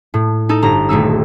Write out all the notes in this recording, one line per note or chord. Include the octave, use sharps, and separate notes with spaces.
A2
D#4 A4
G1 A#5
D#1 A3 D#4 E6